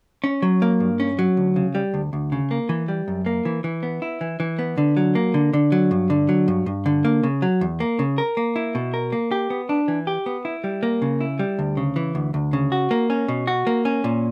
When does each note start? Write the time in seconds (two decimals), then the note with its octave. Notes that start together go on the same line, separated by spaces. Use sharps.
0.24 C#4
0.42 F#3
0.62 A#3
0.80 G2
1.00 C#4
1.19 F#3
1.37 D2
1.56 C#3
1.75 G3
1.94 D2
2.13 D2
2.32 C#3
2.51 A#3
2.69 E3
2.88 G3
3.08 F#2
3.26 A#3
3.45 E3
3.64 E3
3.83 B3
4.02 E4
4.21 E3
4.40 E3
4.59 B3
4.78 D3
4.97 F#3
5.15 A#3
5.34 D3
5.53 D3
5.72 F#3
5.91 G2
6.10 D3
6.29 F#3
6.48 G2
6.66 G2
6.86 D3
7.05 A#3
7.23 C#3
7.42 F#3
7.61 E2
7.80 A#3
7.99 C#3
8.18 A#4
8.37 A#3
8.56 E4
8.75 B2
8.94 A#4
9.12 A#3
9.31 G4
9.50 B3
9.69 D4
9.88 E3
10.07 G4
10.26 B3
10.45 E4
10.64 G3
10.83 A#3
11.02 C#3
11.21 E4
11.39 G3
11.59 D2
11.77 C#3
11.96 E3
12.15 D2
12.34 D2
12.53 C#3
12.72 F#4
12.91 A#3
13.10 C#4
13.28 B2
13.47 F#4
13.67 A#3
13.85 C#4
14.04 A#2